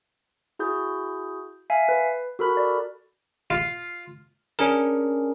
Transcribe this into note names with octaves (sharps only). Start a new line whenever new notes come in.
E4 F#4 G#4 G6
E5 F5 G#5
B4
F#4 A4 A#4 B5 F#6
D5
F4
C#4 D4 G#4 A#4